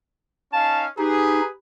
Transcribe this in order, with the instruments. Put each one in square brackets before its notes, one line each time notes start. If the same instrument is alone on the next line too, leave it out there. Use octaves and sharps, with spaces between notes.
[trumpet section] C#4 D#4 F5 [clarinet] A5
[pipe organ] D#4 [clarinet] G4 [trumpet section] G#4 B4